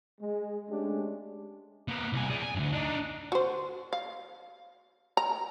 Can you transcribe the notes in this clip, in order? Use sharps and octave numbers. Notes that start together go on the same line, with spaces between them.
G#3
G#3 A3 C#4 D4 G4
A#3 B3
C2 G#5
G#4 D5
G#5
D2 G2
D4 D#4
F#4 C5
F5
A#5